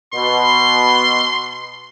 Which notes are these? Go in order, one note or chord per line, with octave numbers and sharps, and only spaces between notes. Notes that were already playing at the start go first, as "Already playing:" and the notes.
B2 C6